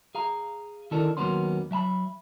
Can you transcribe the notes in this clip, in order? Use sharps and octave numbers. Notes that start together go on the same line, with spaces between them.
G#4 F5 A#5
D#3 C#4 E4 A4 A#4 D5
D#2 F#3 A#3 B3 C#4 C6
F#3 E5 A5 B5